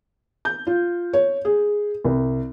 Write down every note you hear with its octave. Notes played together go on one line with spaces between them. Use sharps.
G6
F4
C#5
G#4
C2